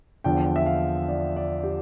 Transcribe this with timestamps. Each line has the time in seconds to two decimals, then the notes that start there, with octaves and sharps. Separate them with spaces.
0.24 E2 D3 F3 G5
0.56 E5
0.66 F5
1.08 D5
1.36 D5
1.63 G4